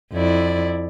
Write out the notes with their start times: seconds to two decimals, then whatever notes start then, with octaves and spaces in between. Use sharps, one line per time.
0.13 F2 E4 D5